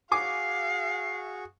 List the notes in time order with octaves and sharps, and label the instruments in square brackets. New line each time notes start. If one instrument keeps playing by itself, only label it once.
[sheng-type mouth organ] F#4 G#4 C#6 [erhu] F5 [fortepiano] G#5 D6 [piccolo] C7